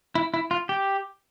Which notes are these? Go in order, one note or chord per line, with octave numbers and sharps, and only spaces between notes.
E4
E4
F4
G4